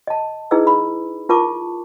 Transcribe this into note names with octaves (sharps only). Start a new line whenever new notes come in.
D#5 A5
D#4 E4 G#4 B4 D#5 E6
B5
F4 A#4 A5 C#6 D6